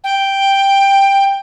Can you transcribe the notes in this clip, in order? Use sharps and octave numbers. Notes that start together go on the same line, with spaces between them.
G5